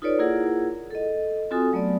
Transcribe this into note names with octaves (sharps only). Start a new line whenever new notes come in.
D#4 F4 A4 B4 C#5 D5
A#3 E4 F4 G#4 A#4 F#5
A4 D#5
C4 F4 F#4 A4 G#5 D#6
F#3 A3 B3 D5